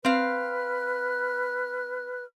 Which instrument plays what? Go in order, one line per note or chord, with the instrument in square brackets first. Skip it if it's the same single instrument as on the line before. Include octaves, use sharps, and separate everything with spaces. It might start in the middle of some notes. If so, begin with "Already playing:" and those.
[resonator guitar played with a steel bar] C4 F5 [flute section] B4 F6 F#6